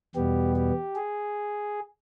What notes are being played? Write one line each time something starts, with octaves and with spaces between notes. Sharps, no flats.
E2 B2 G3 B3 G4
G4
G#4